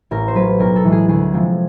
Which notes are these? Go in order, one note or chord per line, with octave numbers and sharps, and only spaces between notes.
A1 A#4
C5
A2 F#3 B4
B1 A#4
A4
A2 E3 G#3
G#4
D2 G#4
C3 F3 G#3